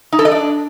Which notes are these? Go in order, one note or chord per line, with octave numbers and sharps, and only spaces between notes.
D#4
A4
D#5
D4